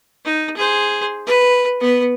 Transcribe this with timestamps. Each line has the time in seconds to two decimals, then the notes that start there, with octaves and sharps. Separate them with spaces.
0.25 D#4
0.56 G#4 C5
1.27 B4
1.81 B3 B4